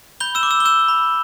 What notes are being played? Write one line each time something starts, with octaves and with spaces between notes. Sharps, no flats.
B5 G6 G7
E6 E7
D6
E6 E7
G7
E6 G6 E7
B5